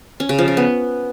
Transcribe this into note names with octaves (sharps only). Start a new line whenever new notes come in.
C#4
C#3
F3
C#3
B3